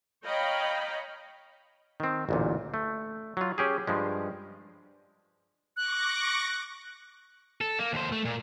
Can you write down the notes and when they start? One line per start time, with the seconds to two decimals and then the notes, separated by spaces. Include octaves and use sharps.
0.25 C#5 D#5 F5 G5 A#5 B5
2.00 D#3 C4
2.29 A1 D2 A#2
2.74 A3
3.37 F#3 F4
3.58 C#4 G4 G#4
3.87 G2 F3 G#3
5.77 C#6 D6 F#6 A#6
7.61 A4
7.79 A#3
7.93 D#2 C5
8.12 A3
8.25 A#2